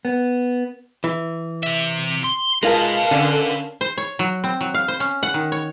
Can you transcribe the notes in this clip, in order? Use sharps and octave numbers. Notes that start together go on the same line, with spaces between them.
B3
E3
C3 E5
C6
G#3 D#4 F4 A#4 B4 D#5 F5 A5
D3 C#4
C5
C#5
F#3
C4
F#3
F5
C5
C#4
F#5
D#3
C#5